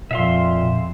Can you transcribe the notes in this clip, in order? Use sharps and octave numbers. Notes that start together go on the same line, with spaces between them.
F2 A#2 E5 F5 C6